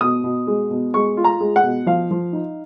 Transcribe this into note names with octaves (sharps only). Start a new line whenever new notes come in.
B2 D#6
B2
G#3
B2
G#3 C#6
F4
A#5
G#3
F#5
B2
F3 F5
F3
D#4